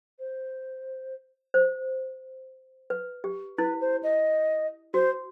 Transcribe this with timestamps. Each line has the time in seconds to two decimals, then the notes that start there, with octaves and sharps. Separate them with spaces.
0.19 C5
1.54 C5
2.90 B4
3.24 G4
3.58 E4 B4
3.81 C5
4.03 D#5
4.94 F#4 C5